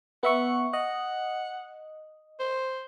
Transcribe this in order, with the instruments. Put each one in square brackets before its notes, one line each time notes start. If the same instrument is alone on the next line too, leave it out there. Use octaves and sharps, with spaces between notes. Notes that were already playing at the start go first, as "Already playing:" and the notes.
[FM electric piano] B3 E5 C#6 [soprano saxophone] F#5
[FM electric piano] D#5 [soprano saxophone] F#5
[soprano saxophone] C5